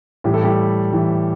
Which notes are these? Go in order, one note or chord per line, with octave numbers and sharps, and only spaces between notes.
A2 E3 G3 G4
A4
G3 G4
A2 E3 G3